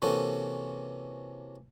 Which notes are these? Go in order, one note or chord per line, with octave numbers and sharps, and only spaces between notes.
C3 E3 A#3 C#4 F#4 A4